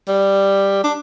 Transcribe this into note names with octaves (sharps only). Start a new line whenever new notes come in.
G3
D4